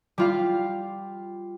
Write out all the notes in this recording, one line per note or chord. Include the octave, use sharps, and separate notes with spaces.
G3 F4 F5